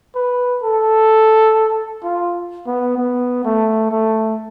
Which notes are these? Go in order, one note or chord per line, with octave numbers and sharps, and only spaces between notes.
B4
A4
F4
B3
B3
A3
A3